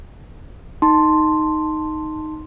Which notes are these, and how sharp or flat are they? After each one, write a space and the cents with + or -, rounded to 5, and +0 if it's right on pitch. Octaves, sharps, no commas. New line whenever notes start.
D#4 +0 A5 +15 C6 +0